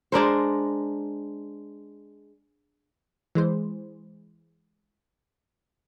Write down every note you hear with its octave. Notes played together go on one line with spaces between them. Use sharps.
G#3 D4 A#4 C5
E3 G#3 C5